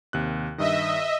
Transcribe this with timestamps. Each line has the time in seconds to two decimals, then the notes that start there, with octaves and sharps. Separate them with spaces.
0.13 D#2 C3 F#6
0.58 G2 D#3 D#5 E5